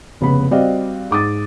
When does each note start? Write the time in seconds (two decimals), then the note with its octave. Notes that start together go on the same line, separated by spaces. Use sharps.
0.21 F1 C#3 B3 B4 B5
0.51 G3 C4 F#4 D5 D#5 F5
1.11 G#2 D6 D#6 A6